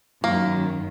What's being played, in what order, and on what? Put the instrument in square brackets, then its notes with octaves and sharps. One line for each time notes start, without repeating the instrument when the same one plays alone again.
[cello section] F#2 D#3 [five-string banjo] A#3